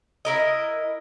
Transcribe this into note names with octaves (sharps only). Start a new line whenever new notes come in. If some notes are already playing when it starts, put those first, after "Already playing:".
E4 A#4 D#5